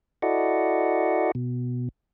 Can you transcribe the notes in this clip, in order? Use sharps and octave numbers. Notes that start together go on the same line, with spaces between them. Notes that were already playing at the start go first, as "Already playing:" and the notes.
E4 F#4 A4 D5 D#5 F#5
B2